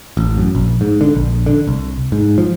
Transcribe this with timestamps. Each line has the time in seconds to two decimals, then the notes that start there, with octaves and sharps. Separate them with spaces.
0.17 A1
0.37 F#2
0.55 A#1
0.81 G#2
1.01 D3
1.15 A#1
1.46 D3
1.67 C2
2.12 G#2
2.38 F3